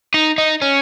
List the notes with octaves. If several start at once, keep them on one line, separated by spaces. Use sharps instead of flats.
D#4
D#4
C#4